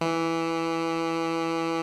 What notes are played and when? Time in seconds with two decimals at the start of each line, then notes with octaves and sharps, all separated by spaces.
0.01 E3